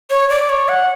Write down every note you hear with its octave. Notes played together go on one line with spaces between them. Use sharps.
C#5
D5
C#5
F#5